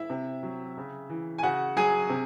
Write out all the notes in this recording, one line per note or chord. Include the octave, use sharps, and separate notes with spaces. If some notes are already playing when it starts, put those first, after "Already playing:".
Already playing: E4 E5
C3
F#3
C#3
E3
G#5
C#3 F#4 F#5
F#3 G#4 G#5
C3